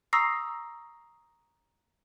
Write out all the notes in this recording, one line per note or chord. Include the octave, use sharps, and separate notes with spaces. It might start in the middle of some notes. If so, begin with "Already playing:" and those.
A#5 C#6 D#6 E6 A#6 C7